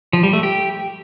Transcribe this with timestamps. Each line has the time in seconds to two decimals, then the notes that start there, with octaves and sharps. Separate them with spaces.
0.13 F3
0.23 G3
0.33 A3
0.43 G4